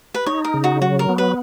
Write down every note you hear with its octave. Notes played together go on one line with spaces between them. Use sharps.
B4
D#4 C#5
A#4
C#3
F#4
F#3 F#4
A#4
B3
B4